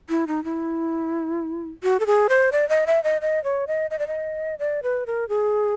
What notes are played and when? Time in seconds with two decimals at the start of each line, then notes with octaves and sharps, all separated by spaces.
0.09 E4
0.27 D#4
0.44 E4
1.83 F#4
2.00 A4
2.06 G#4
2.29 C5
2.52 D5
2.69 D#5
2.87 E5
3.04 D#5
3.21 D#5
3.44 C#5
3.67 D#5
3.91 D#5
3.99 D5
4.07 D#5
4.59 D5
4.83 B4
5.06 A#4
5.29 G#4